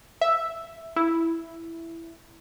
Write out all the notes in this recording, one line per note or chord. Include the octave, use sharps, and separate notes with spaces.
E5
E4